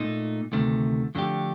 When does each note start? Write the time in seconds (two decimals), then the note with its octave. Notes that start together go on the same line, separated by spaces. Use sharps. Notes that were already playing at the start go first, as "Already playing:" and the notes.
Already playing: A#2 A3 D#4
0.52 D2 C3 D#3 A3
1.15 F2 D3 A3 D4 G4